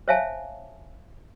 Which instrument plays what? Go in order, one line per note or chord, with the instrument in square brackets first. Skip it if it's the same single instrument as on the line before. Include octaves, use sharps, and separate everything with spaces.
[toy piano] C5 C#5 E5 F5 G#5 A5